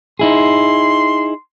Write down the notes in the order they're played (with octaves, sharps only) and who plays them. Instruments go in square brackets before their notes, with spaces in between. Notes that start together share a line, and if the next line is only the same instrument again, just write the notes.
[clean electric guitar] D#4 E4 G#4 [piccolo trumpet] C6